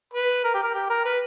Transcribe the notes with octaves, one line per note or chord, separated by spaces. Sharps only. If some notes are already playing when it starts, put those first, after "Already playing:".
B4
A#4
G4
A#4
G4
A#4
B4